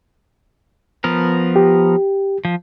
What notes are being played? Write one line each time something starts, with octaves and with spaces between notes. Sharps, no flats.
F3 B3 A#4
G4
F3